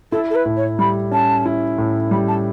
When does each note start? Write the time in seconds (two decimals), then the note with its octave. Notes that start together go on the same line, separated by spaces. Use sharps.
0.12 E4 A4
0.30 A4
0.35 B4
0.46 A2
0.56 C#5
0.79 G3 B5
1.11 C#4 A5
1.46 E4
1.78 A2
2.11 G3 B5
2.28 A5